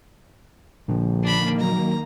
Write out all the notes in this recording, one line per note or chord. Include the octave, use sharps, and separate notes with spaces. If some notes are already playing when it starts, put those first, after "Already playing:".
A#1 A#2 D3 F3
D#3 A#3 D4 B5
F#3 A#5